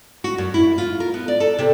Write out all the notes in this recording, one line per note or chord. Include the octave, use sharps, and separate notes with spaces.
F#4
F#2
E4
F4
A#4
B3
D5
A4
C3